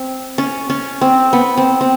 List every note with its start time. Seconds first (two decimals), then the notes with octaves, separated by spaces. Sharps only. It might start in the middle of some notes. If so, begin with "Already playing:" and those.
Already playing: C4
0.38 C#4
0.70 C#4
1.01 C4
1.33 B3
1.57 C4
1.81 C4